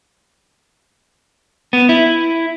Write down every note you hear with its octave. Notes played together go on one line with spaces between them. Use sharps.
B3
E4